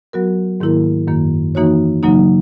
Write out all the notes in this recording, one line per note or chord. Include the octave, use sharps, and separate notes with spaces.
F#3 B3 F#4 A#4
G#2 D#3 A#3 E4 A#4
F#2 D#3 A#3
E3 A#3 D#4 F#4 C#5
C#3 F#3 A#3 D#4